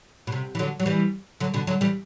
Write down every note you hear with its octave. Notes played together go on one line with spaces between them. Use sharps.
B2
C3
E3
D3 F#3
F#3
E3 G3
D3 F#3
B2 D3
D3 F#3
E3 G3